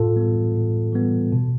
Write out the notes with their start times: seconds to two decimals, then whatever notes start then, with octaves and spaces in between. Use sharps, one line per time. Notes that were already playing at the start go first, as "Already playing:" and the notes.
Already playing: A2 F4 A4
0.16 E3 G3 B3
0.54 A2
0.93 E3 G3 B3
1.32 B2